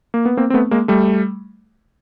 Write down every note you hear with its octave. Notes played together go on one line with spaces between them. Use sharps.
A#3
B3
A#3 C4
C4
A3 B3
G#3 A#3
G3 A3